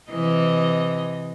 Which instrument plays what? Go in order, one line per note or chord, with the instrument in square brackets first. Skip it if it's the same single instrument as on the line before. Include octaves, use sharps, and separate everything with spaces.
[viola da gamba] C3 E3 D#5